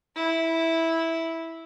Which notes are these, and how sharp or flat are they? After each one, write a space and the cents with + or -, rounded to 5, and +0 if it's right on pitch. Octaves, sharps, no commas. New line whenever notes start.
E4 -10